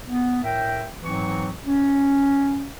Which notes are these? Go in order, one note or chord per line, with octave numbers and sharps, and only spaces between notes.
B3
A2 A#4 E5 G5
G#2 E3 F#3 C4 C#6
C#4